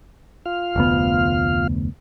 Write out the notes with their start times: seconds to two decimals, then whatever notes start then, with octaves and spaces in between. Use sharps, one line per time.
0.46 F4 F5 F6
0.76 F1 D2 B3